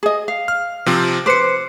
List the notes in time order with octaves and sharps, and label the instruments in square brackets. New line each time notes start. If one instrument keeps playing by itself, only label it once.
[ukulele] G#4 D#5
F5
[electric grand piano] F6
C3 F3 C4
[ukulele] B4 C5 [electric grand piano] D6 C#7